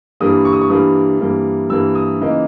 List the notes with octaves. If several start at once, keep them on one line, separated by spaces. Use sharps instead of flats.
G2 E3 G3 A#3 D#6
C#6
D#6
C#6
G2 E3 G3 A#3 D#6
G2 E3 G3 A#3
G2 E3 G3 A#3 E6
D#6
C#3 E3 A#3 D#4